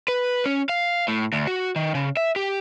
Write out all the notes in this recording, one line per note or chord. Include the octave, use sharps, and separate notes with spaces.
B4
C#4
F5
A2
D2
F#4
D#3
C#3
E5
G4